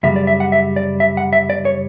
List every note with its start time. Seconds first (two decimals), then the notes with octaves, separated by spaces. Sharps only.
0.03 F#2 C#3 G3 E5
0.16 D5
0.27 E5
0.40 F#5
0.52 E5
0.76 D5
1.00 E5
1.17 F#5
1.33 E5
1.50 D5
1.65 C#5